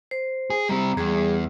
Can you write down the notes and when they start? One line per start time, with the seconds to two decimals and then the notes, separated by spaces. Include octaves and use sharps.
0.11 C5
0.50 G#4
0.69 G3 C4 A#5
0.97 E2 G3 G#4